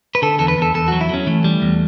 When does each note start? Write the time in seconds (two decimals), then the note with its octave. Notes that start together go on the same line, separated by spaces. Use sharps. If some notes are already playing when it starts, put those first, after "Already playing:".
0.15 B4
0.22 D3 A4
0.39 E2 A4
0.48 B4
0.58 E2 A4
0.74 E2 A4
0.88 F#3 F#4
1.01 E4
1.09 F#3 C#4
1.27 E3 A3
1.44 G3
1.62 E2